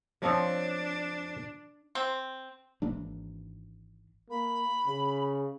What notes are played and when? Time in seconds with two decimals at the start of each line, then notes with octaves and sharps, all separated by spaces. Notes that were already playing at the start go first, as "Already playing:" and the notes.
0.22 F3 C4 D4 C#5
1.95 C4
2.82 G#1 E3 A#3 D4
4.30 A#3 B5
4.86 C#3